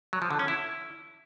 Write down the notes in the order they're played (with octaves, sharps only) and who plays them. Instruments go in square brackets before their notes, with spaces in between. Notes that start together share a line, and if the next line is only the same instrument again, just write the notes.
[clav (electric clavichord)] F#3
F3
D3
C#4
E4